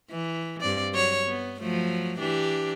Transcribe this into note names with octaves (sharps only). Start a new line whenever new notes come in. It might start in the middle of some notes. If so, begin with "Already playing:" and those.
E3
G2 C4 D5
F#3 C#5
B3
F3 F#3 A3
E3 D4 G4